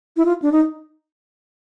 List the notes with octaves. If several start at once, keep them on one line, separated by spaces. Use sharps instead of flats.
E4
F4
D4
D#4